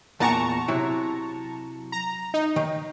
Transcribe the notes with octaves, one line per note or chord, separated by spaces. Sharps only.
E2 A#2 F#5 A5 A#5 C#6
C3 F#3 E4
A#5
D#4
D#3